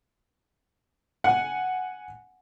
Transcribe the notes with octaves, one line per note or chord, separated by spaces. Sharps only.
F#5 G#5